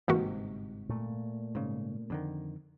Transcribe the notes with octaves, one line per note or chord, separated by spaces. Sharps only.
G1 G#2 C3 E3 A#3 F#4
A#2 A3
G#2 C#3
F2 D3 D#3